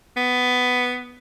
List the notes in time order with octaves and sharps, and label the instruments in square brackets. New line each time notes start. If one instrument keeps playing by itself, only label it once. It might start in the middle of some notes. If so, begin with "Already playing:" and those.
[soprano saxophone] B3